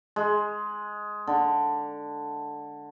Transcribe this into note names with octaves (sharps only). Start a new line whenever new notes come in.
G#3
D3